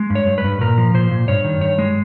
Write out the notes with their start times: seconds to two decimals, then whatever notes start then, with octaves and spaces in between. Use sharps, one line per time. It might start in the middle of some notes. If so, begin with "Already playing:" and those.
Already playing: G#3
0.10 G2
0.15 C#5
0.27 G2
0.38 B4
0.44 G2
0.61 A#2 A#4
0.78 F3
0.94 A#2 C5
1.11 A#2
1.28 G2 C#5
1.44 D#3
1.61 G2 C#5
1.79 G#3